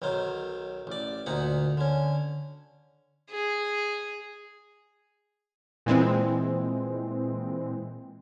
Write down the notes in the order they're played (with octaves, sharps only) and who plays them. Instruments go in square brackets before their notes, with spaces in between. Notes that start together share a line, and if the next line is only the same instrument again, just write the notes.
[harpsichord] B1 D#3 F#3 C5
A1 D5
D2 A#2 D#4 F#5
D3 C#4
[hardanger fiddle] G#4
[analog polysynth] A#2 E3 G#3 C4